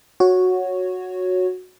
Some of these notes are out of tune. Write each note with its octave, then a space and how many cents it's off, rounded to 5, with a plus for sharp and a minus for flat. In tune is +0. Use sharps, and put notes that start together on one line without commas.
F#4 -10 C#5 +0